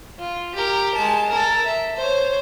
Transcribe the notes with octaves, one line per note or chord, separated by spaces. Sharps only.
F4
G4 A#4
G#3 A5
A4 A#4
E5
C5 C#5